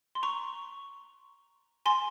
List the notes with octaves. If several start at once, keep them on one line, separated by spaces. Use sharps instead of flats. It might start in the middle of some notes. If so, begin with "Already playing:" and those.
C6
A#5 C#6
G#5 C6